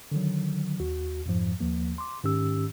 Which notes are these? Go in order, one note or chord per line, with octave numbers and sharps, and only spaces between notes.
D3 D#3 F#3
D#2 F#4
F2 G#2 F3
D#2 F3 A#3
C6 D6
G#2 D#3 C#4 G4 E6